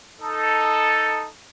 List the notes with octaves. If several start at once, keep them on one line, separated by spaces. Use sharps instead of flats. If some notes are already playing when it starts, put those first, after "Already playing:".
D#4 A4